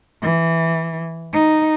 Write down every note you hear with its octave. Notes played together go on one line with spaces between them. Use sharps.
E3
D#4